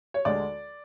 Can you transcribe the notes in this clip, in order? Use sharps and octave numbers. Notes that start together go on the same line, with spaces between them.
C#5
D2 D3 G#3 D5